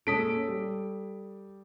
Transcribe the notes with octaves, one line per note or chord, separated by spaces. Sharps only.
A#2 G#3 C#4 A4 D#6 B6 D7
G3